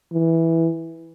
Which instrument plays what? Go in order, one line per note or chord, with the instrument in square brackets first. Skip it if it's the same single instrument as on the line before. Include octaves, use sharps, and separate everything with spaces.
[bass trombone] E3